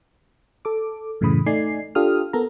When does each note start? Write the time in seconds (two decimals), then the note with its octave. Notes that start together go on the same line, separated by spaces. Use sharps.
0.65 A4 D6
1.21 F#2 A2 C#3 E3 B5 D#6
1.46 A3 D#4 D5 G#5 C7
1.95 D4 F4 G4 A4 D#6 F6
2.33 B3 A4 A#4 A#5